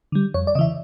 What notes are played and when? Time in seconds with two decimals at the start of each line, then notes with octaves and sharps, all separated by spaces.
0.12 D3 G3
0.34 F2 C#5
0.47 D5
0.55 C#3 D#5
0.59 E3 E5